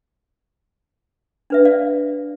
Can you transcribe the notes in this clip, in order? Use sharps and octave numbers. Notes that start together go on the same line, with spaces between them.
D4 B4 E5
D5 F5